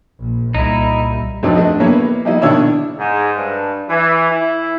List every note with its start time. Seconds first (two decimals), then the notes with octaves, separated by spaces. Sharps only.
0.20 A#1
0.55 C2 A#2 G3 D#4 E4
1.43 F2 C3 F#3 D4 D#4 B4
1.55 A3 D4 F#4 D#5
1.80 G3 A#3 B3 E4 B4 C#5
2.25 G3 A#3 D#4 E4 D#5
2.41 B2 D#3 D4 E4 C#5 E6
2.98 G#2
3.37 G2
3.90 E3
4.31 E4